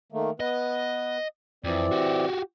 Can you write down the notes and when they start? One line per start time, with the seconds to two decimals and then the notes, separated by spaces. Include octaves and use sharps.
0.12 D#3 A3 A#3
0.40 B3 B4 D#5
1.65 F2 E3 C4 D5
1.92 F#4 G4